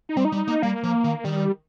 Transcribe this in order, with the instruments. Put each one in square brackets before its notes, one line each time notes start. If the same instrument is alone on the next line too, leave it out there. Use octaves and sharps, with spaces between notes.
[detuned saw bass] D#4
[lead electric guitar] G3 [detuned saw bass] C4
[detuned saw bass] D#4
[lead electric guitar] G3
A#3
[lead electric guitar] G3 [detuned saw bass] A#3
[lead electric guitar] F3
D#3
[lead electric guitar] D#3 [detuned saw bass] G3